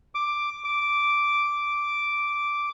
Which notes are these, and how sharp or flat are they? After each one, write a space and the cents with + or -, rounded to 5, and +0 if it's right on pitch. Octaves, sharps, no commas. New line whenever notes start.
D6 +5
D6 -5